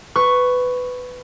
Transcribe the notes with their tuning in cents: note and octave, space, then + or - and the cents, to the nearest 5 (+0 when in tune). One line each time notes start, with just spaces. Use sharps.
B4 +15 C#6 +0